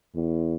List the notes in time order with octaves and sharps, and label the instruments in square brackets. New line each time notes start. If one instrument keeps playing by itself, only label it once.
[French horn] E2